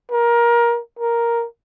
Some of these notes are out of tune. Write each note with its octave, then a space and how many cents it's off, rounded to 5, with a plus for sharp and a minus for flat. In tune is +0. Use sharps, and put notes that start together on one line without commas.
A#4 +20
A#4 +5